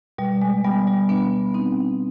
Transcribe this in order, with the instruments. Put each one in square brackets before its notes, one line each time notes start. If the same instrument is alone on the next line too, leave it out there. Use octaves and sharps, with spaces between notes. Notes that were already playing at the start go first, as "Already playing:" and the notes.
[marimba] B2 G3
G#3
G3 B3
G3
B2 B3 D4
C4 D#4